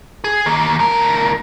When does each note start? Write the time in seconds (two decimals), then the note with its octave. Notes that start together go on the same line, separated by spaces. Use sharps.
0.24 G#4
0.46 D#3 A#3
0.79 D2 A#4